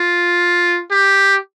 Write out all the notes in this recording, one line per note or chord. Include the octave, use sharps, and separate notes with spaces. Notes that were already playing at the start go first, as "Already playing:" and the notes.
Already playing: F4
G4